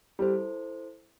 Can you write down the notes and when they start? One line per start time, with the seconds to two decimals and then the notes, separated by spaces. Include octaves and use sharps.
0.19 G3 E4 A4 C5